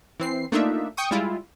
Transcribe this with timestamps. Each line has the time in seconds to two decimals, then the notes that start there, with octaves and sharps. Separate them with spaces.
0.20 E3 C4 C7
0.52 A3 A#3 D4 D#4 F4 E5
0.97 G5 C#6 D#6
1.11 G3 G#3 E4 F4